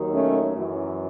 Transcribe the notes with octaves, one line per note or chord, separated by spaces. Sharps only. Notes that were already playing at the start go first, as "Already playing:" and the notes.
Already playing: D#2 D#3 F#3
A3 C#4
F#2 E3